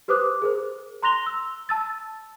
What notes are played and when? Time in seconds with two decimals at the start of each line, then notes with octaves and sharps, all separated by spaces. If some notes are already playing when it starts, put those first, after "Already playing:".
0.08 G4 B4 C5 D6 D#6 F#6
0.42 G#4 A#4 C5
1.03 A#5 C6 F#6 A#6 F7 G7
1.26 E6
1.69 A5 E6 A6